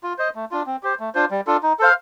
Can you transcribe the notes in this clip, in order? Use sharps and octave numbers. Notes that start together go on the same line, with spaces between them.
F4
C5 D#5
A3
D4 F4
C4
G4 C5
A3
D4 F4 C5
G3
D4 F4 A4
D#4
A4 C5 F5